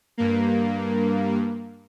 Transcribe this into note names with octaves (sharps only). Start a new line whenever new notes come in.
G2 A#3